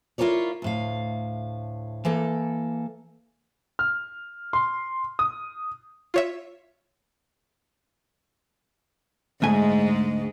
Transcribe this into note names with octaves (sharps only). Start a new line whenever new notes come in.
E4 F4 G#4 A#4 C#5 D5
D2 A2 F5
E3 A#3 A4
F6
C6
D#6
F4 C#5 E5
D2 G#2 G#3 A3 G#5